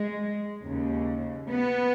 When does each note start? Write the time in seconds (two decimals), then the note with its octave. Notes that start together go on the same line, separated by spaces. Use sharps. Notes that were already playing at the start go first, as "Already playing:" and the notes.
Already playing: G#3
0.64 D#2 C#3
1.50 B3